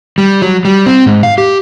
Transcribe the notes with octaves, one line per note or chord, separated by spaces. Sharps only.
G3
F#3
G3
C4
G#2
F5
G4